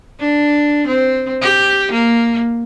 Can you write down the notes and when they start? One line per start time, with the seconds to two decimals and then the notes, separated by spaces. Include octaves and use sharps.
0.20 D4
0.87 C4
1.42 G4
1.92 A#3